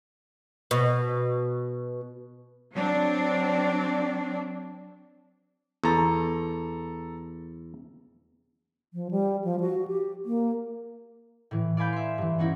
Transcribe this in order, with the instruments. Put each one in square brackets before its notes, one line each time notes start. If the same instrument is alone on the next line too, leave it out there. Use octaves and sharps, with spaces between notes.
[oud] B2
[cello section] F#3 C4 D4
[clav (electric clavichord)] E2 A5 [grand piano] A4 A#5
[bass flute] F3
G3
F3
F#4
G4
A#3
[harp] A2 E3
D5 F5 G#5 B5 G6
E5 C6
G2 E3
B3 C#4 D#4 E4